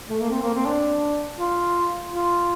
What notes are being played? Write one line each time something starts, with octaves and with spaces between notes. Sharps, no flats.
A3
A#3
C4
A#3
C4
D4
F4
F4